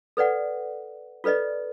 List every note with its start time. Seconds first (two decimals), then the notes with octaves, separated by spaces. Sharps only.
0.17 A4 B4 D5 F#5
1.24 F4 A4 B4 D5 D#5